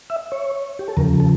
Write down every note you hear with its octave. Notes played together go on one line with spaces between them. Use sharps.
E5
C#5
G4
A4
E2 C#3 F3 A#4
A4